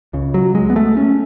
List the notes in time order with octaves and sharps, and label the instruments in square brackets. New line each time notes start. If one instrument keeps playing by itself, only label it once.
[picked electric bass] C#2 C#3
F#3
G#3
B3
A3
C#4